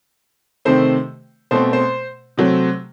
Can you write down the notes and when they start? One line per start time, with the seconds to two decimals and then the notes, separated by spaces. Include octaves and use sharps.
0.65 C3 D#3 A3 C4 C5
1.51 B2 A3 C4 C5
1.73 C5
2.38 C3 F#3 A3 C4